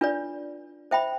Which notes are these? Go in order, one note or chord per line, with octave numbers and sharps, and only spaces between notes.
D4 F4 B4 D5
C5 E5 G5 B5